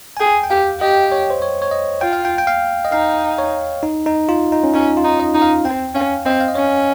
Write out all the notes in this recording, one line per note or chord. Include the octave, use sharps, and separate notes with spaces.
G#5
G#4 G5
G5
G4 F5
G4 D#5
C#5
C5
C#5
C#5
D#5
F4 G5
F5
G5
G5
F5
D#5
D#4 F5
C#5
D#4
D#4
F4
D#4
C#4
C#4 D#4
F4
D#4
D#5
D#4
F5
C4 G5
C#4 F5
C4 D#5
F5
D#5
C#4 C#5